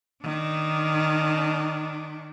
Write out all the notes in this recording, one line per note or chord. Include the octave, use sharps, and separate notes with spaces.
D#3 D4